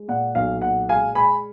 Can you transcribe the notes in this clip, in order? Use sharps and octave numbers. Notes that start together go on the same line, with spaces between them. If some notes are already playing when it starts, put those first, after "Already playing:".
Already playing: G#3
A#2 F#5
B1 F5
A#2 F#5
G#3 F5 G#5
G#3 G#5 B5